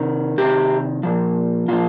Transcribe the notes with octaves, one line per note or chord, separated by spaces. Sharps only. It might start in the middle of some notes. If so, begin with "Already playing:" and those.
Already playing: C3 D#3
C3 D#3 G4
A#2 F3
A#2 F3 F4